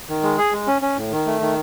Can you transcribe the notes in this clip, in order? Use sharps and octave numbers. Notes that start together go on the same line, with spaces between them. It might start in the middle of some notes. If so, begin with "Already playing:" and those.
D#3
G#3
G#4
G#3
C#4
C#4
A2
D#3
A3
D#3